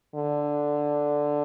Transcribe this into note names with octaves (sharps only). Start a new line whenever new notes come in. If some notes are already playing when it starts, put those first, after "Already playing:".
D3